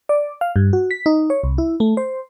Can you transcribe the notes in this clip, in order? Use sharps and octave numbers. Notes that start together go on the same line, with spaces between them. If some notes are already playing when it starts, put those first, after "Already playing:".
D5
F5
G2
F#4
B6
D#4
C#5
C2
E4
A3
C5